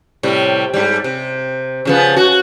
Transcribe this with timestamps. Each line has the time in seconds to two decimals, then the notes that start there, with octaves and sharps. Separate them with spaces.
0.23 A2 C3 G3
0.74 G#2 G3
1.04 C3
1.85 C#3 F3 B3
2.17 F#4